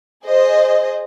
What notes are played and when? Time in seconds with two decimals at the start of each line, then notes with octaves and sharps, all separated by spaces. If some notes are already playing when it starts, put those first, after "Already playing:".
0.25 G#4 C5 D#5